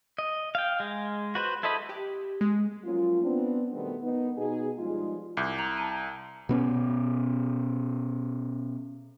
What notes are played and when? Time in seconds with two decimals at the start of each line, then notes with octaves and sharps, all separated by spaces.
0.18 D#5
0.55 F5 G5
0.80 G#3
1.35 F#4 B4 C5
1.63 E4 A4 C5 D#5 B5
1.89 G4
2.41 G#3
2.84 F3 F#3 A#3 C#4 F4
3.23 B3 C4 D4
3.73 B2 D#3 G3 A3 B3 C4
4.02 D#3 B3 D#4
4.38 B2 D#4 G#4
4.78 F3 G3 G#3 D#4 F4
5.37 C2 D6 G6
5.58 A#5 F7 F#7
5.78 A5 A#5 D#7
6.49 B2 B3 C#4